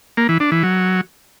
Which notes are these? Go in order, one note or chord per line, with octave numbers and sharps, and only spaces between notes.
A#3
E3
D4
E3
F#3